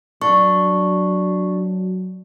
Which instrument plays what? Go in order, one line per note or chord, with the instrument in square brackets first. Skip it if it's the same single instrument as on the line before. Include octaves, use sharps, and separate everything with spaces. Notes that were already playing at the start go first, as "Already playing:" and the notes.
[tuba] F#3 [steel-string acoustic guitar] D4 [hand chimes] C#6